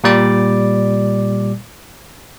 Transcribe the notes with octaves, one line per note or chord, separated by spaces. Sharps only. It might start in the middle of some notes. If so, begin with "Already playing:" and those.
A#2 G3 D5 D6